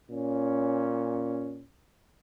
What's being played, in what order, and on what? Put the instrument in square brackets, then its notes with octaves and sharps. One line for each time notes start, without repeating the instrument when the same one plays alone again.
[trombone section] A#2 C#4